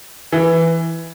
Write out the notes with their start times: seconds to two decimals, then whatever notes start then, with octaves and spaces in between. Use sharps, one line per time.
0.32 E3